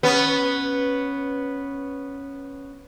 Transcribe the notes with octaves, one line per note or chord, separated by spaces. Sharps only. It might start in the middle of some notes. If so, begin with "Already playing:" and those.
B3 C#4